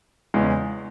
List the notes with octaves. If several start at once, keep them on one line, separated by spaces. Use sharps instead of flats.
E2 C#3 G#3 C#4